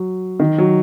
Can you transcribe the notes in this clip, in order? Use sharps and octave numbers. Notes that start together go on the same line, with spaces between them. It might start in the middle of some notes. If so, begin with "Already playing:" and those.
Already playing: F#3
D#3
F#3